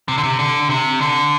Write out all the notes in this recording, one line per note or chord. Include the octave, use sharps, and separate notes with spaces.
C3
D3
C3
D3
C3
D3